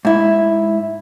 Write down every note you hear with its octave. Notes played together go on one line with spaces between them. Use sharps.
G#2 E4